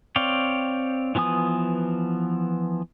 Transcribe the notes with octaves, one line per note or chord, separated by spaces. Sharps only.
C4 C#5 D5 F5 G5
E3 F3 B3 G#5 D#6